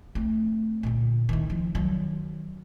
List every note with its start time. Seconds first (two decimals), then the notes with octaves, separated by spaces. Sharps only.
0.15 A3 C4
0.83 A#2 D3
1.29 D#3 E4
1.50 F3
1.75 D#3 F#3